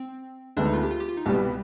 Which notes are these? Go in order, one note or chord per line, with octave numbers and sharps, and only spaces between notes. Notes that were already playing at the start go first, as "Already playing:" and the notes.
Already playing: C4
D2 D3 G#3 B3 D4
D#4
F4
G4
F4
G4
F4
D#4
C2 B2 G3 B3 G4